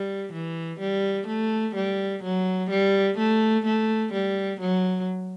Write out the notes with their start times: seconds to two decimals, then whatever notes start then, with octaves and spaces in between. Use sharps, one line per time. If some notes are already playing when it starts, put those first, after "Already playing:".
Already playing: G3
0.33 E3
0.80 G3
1.27 A3
1.75 G3
2.23 F#3
2.70 G3
3.18 A3
3.66 A3
4.13 G3
4.60 F#3